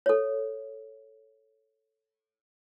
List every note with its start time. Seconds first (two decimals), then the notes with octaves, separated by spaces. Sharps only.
0.06 A4 C#5